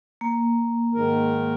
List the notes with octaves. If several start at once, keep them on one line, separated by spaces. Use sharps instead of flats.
A#3
G#2 D#3 A#4